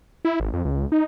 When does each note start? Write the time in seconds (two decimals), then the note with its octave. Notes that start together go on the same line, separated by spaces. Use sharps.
0.25 E4
0.40 G#1
0.53 F2
0.65 C#2
0.92 D#4